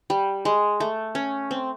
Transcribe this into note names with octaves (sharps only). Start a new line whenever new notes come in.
G3
G#3
A3
C#4
C4